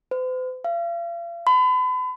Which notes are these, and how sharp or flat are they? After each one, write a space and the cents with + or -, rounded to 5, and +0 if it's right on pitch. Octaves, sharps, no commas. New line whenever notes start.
C5 -45
F5 -40
B5 +40